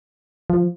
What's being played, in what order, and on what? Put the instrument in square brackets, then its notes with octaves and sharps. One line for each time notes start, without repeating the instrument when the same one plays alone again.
[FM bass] F3